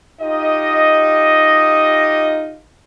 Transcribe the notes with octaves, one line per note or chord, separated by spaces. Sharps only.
D#4 F4 G4 D#5